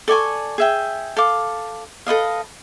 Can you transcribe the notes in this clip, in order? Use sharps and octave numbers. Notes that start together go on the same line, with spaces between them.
A4 D5 G#5 C#6
G#4 E5 G5
A4 F5 D6
A4 B4 D#5 F5